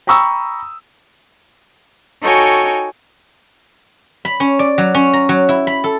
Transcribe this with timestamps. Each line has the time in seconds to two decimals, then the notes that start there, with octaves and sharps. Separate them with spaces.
0.07 G5 A#5 B5 C#6 D#6 E6
2.21 D#4 F#4 A4 C#5 G5 G#5
4.25 B5
4.40 C#4
4.59 D5
4.78 F#3
4.95 C#4
5.13 A#5
5.29 F#3
5.49 E4
5.67 B5
5.84 A4